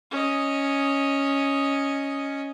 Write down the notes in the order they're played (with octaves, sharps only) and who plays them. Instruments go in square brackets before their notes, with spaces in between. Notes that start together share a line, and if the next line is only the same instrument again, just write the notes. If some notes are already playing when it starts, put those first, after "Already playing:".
[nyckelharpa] C#4 D#5